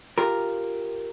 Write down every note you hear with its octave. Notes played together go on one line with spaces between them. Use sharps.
F4 G4 A#4